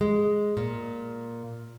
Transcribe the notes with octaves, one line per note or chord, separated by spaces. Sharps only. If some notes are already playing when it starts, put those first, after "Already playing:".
G#3
A#2